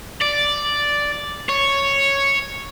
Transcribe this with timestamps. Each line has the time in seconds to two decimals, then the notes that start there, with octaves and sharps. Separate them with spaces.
0.22 D5
1.49 C#5